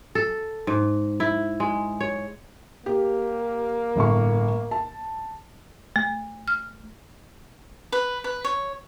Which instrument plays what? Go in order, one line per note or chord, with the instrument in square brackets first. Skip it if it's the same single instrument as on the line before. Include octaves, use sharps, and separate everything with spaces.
[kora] A4
G#2
E4
G#3
C#5
[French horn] A#3 [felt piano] G4
[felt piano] G1 A2 C#6
A5
[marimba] A3
F6
[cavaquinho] B4
B4
C#5